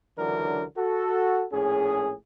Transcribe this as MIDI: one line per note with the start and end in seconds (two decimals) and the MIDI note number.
0.18 0.65 37
0.18 0.65 50
0.18 0.65 52
0.18 0.65 54
0.18 0.65 62
0.18 0.65 70
0.77 1.46 66
0.77 1.46 69
1.52 2.14 34
1.52 2.14 45
1.52 2.14 61
1.52 2.14 68